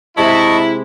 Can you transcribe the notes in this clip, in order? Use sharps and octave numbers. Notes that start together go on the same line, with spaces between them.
C3 G#3 E4 D#5 A5 C#6